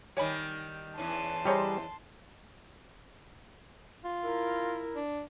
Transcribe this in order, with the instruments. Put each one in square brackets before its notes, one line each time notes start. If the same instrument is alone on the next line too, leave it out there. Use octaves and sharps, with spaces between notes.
[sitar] D#3 G3 [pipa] C#5 G#5 B5
[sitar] E2 E3 C#4 [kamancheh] A5 C6
[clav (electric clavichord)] G3 G#4 A#5 [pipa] C5 C#5 D#5
[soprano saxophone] F4
[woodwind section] E4 A#4
[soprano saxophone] D4